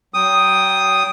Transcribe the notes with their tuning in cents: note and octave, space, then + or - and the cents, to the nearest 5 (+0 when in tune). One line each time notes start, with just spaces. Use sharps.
F#3 +35 G5 +0 D#6 +0